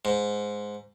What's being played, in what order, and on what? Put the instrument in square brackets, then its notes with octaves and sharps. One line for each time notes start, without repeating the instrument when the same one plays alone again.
[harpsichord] G#2